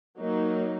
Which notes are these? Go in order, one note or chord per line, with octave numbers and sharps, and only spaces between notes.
F#3 A#3 D#4